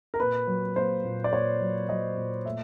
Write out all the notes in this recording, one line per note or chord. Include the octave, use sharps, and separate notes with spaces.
A#4
A#2 B4
F#3
A#3 C5
A#2
D5
A#2 C#5
F#3
F#3 D#5
A#2
A3 E5